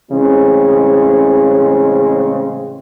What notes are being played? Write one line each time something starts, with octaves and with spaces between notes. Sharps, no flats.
A2 C#3 E3 G#3 C4 C#4